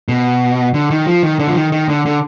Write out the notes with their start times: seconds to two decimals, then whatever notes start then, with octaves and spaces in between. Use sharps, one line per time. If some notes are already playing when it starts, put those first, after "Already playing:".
0.09 B2
0.74 D3
0.90 D#3
1.07 F3
1.23 D#3
1.39 D3
1.48 F3
1.56 D#3
1.72 D#3
1.89 D3
2.06 D3